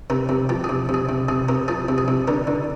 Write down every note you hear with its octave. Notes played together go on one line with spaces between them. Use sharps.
C3 A#4
C3
F3 G4
G#4
C3
C3
G#4
C3
C3 G#4
C3 A#4
F3 G#4
C3
G#4
C3
D3 A#4
D3